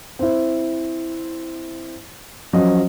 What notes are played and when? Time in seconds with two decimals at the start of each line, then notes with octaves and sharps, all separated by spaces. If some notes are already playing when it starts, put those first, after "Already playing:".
0.19 C4 E4
2.53 F3 F#3 C#4 D#5